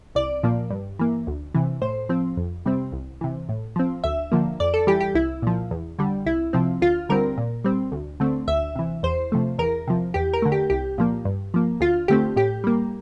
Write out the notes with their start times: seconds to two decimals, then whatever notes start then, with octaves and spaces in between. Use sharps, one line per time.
0.15 C2 D5
0.43 A#2 F3 A#3
0.70 G2
0.99 E3 A#3
1.27 D2
1.54 C3 E3
1.82 A2 C5
2.09 F3 C4
2.37 F2
2.66 C3 G3 C4
2.92 C2
3.21 C3 E3
3.49 A2
3.76 F3 C4
4.04 D2 E5
4.32 D3 F3 A#3
4.60 F2 D5
4.74 A4
4.87 E3 G3 G4
5.01 G4
5.15 C2 E4
5.42 A#2 F3
5.71 E2
5.99 D3 G3
6.26 C2 E4
6.53 C3 F3 C4
6.82 D2 F4
7.09 D3 G3 C4 A#4
7.38 A#2
7.64 G3 C4
7.92 D2
8.20 D3 A3 C4
8.48 D2 E5
8.76 C3 E3
9.03 E2 C5
9.32 C3 F3 A3
9.58 E2 A#4
9.87 C3 F3
10.14 E2 G4
10.33 A#4
10.42 D3 A3
10.52 G4
10.70 C2 G4
10.98 A#2 F3 A#3
11.25 G2
11.54 F3 A#3
11.80 D2 F4
12.08 D3 A3 C4 G4
12.36 A2 G4
12.64 G3 A#3